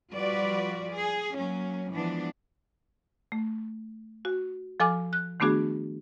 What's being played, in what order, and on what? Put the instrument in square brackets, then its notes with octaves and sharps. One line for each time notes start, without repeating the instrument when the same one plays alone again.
[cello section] F3 G3 F4 F#4 B4 D5
G#4
F#3 A#3 C#4
E3 F3 G#3 B3 D4
[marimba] A3
F#4
F3 A4 G#5 D6 F6
F#6
D#3 A3 B3 D4 F#4 G#4